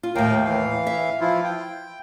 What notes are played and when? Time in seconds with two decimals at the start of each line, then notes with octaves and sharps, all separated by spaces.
0.03 F4
0.15 D#2 A2 A#4 F5 G5
0.44 E3 F5
0.87 E5
1.21 F3 E4 F4
1.44 G5